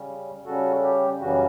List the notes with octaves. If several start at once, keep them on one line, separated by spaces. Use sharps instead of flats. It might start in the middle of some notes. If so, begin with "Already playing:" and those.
Already playing: C#3 G3 C#4
C#3 G3 C#4 F#4 A4
G4
F#2 C#3 E3 G3 C#4 F#4